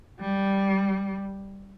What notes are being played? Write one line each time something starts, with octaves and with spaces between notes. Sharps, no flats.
G3